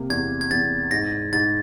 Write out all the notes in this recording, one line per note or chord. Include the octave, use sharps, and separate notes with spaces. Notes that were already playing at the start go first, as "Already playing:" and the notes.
Already playing: C3 A#3
E2 G#6
G#6
E2 A6
G#2 A#6
G#2 A6